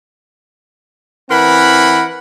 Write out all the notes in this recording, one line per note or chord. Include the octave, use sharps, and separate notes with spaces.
E3 C4 A#4 F#5 B5